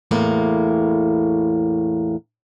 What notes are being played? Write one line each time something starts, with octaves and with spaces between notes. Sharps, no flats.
E2 A2 A#3